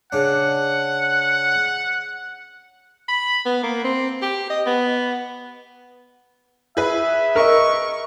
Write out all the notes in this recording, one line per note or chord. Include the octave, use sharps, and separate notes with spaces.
C#3 D4 F#5
B5
B3
A#3
C4
G4
D#5
B3
G#4 B4 E5
A#4 D#5 C#6